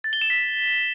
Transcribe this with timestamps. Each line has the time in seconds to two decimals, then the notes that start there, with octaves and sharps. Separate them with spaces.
0.04 A6
0.13 G7
0.21 E7
0.30 B6